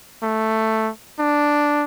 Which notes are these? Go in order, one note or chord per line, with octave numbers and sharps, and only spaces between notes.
A3
D4